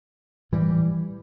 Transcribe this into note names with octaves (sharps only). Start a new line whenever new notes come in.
A2 E3 G3